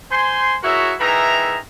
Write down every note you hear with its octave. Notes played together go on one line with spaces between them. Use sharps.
C5 G#5 C6
E4 F#4 G#4 A#4 C#5 E5
D#3 E3 G#4 E5 A#5